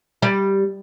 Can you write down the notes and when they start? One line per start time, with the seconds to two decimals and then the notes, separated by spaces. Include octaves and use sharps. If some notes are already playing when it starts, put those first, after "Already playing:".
0.22 G3